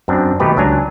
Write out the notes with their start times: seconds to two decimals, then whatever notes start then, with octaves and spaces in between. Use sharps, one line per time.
0.08 F#2 C4 D4
0.40 B2 D#3 A3 D#4 G4 B4
0.57 C#2 F#3 D4 G#5 A#5